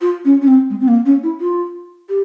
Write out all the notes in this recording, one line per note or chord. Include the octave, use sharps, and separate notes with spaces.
F4
C#4
C#4
C4
G#3
C4
A#3
C#4
E4
F4
G4